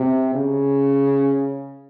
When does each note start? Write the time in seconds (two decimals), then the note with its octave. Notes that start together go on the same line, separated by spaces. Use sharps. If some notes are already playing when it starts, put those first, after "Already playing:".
Already playing: C3
0.35 C#3